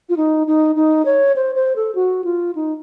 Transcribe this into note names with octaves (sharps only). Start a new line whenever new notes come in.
F4
D#4
D#4
D#4
C#5
C5
C5
A4
F#4
F4
D#4